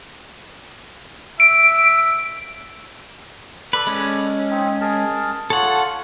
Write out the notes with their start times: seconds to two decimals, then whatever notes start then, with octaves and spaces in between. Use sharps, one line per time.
1.40 E5 D7
3.73 A4 B4 D5
3.87 G#3 C#4
4.50 C4 D#4
4.81 G#4 A#4 A5
5.50 F4 A4 C#5 F#5 A5